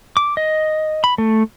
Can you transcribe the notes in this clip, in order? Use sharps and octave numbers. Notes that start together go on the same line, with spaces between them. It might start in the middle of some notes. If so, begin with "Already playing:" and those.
D6
D#5
B5
A3